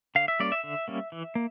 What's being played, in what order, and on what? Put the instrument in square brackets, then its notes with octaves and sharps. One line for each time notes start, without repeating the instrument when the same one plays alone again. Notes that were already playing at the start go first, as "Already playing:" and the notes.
[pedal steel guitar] D3 F5
E5
G3 A#3 C#4 D5
E5
D3
G3 A#3 C#4
E3
A#3